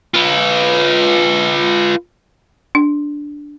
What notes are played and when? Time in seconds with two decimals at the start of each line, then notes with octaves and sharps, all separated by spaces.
0.14 F4 B4
2.75 D4